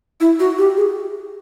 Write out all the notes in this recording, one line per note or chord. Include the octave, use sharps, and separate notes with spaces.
E4
F#4
G4
G#4